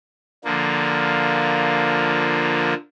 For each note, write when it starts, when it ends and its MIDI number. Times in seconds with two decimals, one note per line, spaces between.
0.45 2.74 50
0.45 2.74 53
0.45 2.74 58